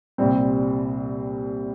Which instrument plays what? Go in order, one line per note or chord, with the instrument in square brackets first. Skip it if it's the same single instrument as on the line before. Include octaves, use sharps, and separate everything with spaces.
[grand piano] C2 A#2 G3 C4